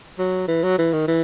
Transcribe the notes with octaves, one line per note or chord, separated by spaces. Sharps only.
F#3
E3
F#3
E3
D#3
E3